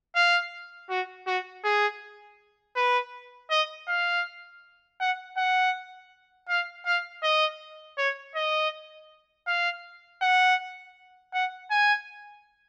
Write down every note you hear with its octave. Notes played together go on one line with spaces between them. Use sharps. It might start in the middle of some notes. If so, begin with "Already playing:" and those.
F5
F#4
F#4
G#4
B4
D#5
F5
F#5
F#5
F5
F5
D#5
C#5
D#5
F5
F#5
F#5
G#5